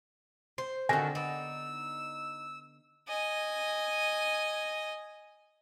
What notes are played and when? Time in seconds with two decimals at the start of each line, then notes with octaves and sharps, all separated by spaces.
0.58 C5 C6
0.89 D3 D#3 C4 F#4 G4 A4 G#5 A#6
1.15 B3 D#4 D5 E6
3.08 D#5 G#5